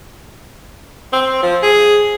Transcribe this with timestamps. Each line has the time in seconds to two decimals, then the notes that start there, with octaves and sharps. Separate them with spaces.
1.13 C4
1.43 F3
1.63 G#4